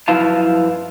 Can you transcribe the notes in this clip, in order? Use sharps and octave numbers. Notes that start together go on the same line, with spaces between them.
F#2 F3 E4 B4 F5 A5